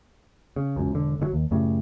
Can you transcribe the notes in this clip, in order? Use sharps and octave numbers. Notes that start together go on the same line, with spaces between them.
C#3
E1 C#2 F#2
E1 D3
G1 D3 F#3
D#2
F#2 A2 C#3 G3